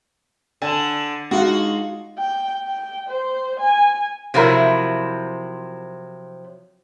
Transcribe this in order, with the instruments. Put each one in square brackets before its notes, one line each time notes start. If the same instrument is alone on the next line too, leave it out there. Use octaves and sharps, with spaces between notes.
[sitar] D3 [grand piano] G#5 A5 E7
[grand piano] G#3 D#4 F4 [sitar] F#4
[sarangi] G5
G5
C5
G#5
[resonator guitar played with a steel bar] C3 F3 F#3 E4 A#4